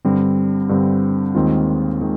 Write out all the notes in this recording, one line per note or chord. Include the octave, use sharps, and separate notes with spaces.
G2 D3 G3 C4
G2 D3 G3 C4
D#2 D#3 G#3 C4 F4
D#3 G#3